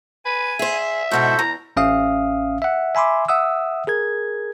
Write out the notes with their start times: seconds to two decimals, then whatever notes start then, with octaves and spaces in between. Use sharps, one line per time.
0.25 B4 G#5
0.59 G#4 C5 E5
1.11 G#2 B2 E4 F#4 A4 C5
1.39 E2 A#5
1.76 A1 C#4 E5 F5 D#6
2.62 E5 F#5
2.95 E5 G#5 B5 C6 D6
3.29 E5 F#5 D#6 E6
3.87 G#4 A#4 G#6